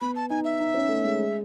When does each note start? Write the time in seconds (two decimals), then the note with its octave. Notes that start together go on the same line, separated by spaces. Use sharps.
0.01 B3 B5
0.16 A5
0.30 D#4 G#5
0.44 E5
0.60 D#4
0.74 C#4
0.89 A3
1.04 G#3
1.18 G#3